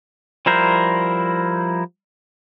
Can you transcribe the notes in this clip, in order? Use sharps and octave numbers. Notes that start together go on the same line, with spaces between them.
F3 G3 E4 A#4 C5